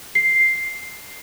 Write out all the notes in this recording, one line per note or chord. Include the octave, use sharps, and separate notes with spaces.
C7